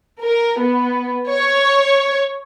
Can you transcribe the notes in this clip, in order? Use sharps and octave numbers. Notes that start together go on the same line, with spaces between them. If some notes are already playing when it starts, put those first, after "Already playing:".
A#4
B3
C#5